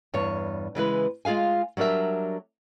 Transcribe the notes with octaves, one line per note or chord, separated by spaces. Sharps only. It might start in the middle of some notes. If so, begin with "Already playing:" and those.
E2 G2 C#5
C#3 E3 G#3 B4
G#3 F4 G#4 F5 G#5
F#3 G3 D4 A#4 E5